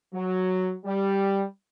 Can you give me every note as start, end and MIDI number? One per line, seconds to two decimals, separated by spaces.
0.14 0.74 54
0.85 1.43 55